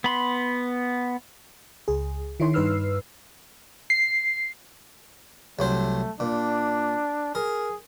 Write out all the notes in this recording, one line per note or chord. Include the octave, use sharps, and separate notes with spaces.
B3 B5 C6
C#2 G#4
D#3 E4 C#5 C6
G2 D#4 B4 E6 F6 C7
C7
C2 F#3 A3 C5
A#2 D4
G#4 A#4